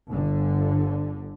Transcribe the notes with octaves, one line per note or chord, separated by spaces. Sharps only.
G1 D3